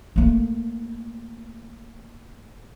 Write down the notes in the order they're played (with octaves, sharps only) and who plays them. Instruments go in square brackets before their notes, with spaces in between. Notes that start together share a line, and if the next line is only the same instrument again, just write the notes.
[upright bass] A3 A#3